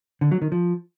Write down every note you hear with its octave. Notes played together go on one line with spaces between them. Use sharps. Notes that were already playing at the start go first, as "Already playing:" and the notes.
D3
F#3
D#3
F3